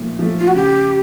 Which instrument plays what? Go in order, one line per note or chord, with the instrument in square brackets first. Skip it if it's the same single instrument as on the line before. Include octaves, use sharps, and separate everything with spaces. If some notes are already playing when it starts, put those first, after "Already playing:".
Already playing: [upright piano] A#2 F3 A3
F3 A3
[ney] F4
F#4
[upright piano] C#3 [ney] G4